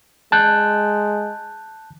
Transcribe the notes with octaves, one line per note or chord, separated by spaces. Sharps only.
G#3 A5 F#6 G6